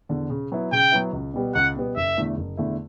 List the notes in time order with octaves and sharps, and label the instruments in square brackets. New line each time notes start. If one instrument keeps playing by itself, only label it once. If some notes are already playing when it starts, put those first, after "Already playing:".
[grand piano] E2 D3
C#3
F#3 B3 E4
[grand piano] C#3 [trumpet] G5
[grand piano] F#3 B3 E4
C#2
B2 G3 B3
[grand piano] C#2 [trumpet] F#5
[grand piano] B2 G3 B3
[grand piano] F#1 [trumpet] E5
[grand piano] E2 D3 A3 E4
F#1
E2 D3 A3 E4